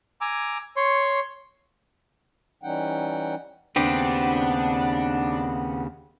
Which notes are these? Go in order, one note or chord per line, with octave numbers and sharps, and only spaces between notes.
G#5 A#5 D6 E6
C#5 C6 C#6
E3 G3 C#4 D#4 F#5 G5
D#2 C#3 B3 C4 D4 G4 F#5